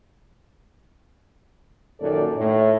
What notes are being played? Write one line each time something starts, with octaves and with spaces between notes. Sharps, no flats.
F#2 A#2 D#3 A4 D5
A2